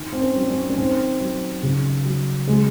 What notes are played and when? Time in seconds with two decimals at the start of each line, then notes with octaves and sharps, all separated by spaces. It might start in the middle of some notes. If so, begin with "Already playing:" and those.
Already playing: D#3
0.13 C4
0.22 C#4
0.36 F#3
0.49 C#4
0.70 C#4
0.78 D#3 C4
1.20 F#3
1.63 C#3
2.05 F#3
2.47 C#3 G#3